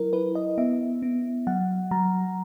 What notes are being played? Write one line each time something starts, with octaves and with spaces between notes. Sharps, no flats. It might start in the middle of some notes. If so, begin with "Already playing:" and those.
Already playing: F#3 E4 A#4
E4 B4
D#5
B3 E5
B3
F#3 F#5
F#3 A#5